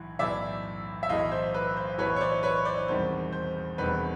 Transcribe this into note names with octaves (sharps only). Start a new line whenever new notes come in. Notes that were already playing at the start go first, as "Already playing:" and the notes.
Already playing: B1 A2 E3
B1 A2 E3 A3 D5 E5
E5
B1 A2 E3 A3 D#5 F5
C5
B4
C5
B1 A2 E3 A3 B4 C#5
C#5
C5 D5
B4 C#5
C5 D5
E1 E2 C3 D#3 G3 C5
C5
E1 E2 C3 D#3 G3 B4